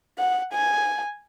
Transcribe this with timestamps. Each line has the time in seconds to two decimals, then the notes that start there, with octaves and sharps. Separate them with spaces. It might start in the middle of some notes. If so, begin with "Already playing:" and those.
0.19 F#5
0.53 G#5